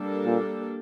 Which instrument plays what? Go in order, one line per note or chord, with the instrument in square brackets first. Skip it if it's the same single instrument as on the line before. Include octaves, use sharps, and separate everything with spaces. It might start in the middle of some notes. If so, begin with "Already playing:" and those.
Already playing: [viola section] G3 A#3 D4 A4
[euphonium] A#2